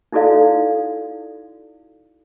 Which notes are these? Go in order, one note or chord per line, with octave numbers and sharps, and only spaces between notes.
D#4 E4 F#4 A4 D5 F5